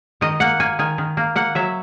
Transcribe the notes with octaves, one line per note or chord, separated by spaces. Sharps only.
D#3 D#5
A#3 F#5
A#3 G#5
D#3 G#5
D#3
A#3
A#3 F#5
F#3 E5